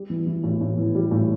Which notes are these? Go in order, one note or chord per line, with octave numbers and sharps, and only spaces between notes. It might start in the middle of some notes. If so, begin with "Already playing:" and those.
Already playing: G3
E3
E3
A2
A2
E3
G3
A2